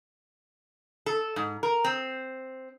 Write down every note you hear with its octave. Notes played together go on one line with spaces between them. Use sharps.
A4
G#2
A#4
C4